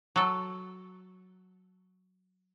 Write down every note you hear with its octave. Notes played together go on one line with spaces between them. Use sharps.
F#3 A4